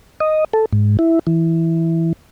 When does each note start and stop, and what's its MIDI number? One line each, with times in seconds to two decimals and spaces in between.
0.20 0.44 75
0.53 0.65 69
0.73 0.97 44
0.99 1.19 64
1.27 2.13 52